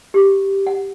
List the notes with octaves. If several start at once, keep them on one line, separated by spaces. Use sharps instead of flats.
G4
F#5